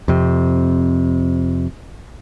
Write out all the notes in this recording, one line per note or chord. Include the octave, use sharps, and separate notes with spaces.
F2 C3